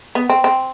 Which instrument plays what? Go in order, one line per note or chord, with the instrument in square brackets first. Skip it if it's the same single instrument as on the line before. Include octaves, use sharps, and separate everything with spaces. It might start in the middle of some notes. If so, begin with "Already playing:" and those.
[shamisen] B3
C4
C4